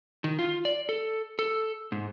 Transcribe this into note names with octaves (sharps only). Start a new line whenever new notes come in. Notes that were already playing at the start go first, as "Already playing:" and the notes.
D#3
F4
D5
A4
A4
G#2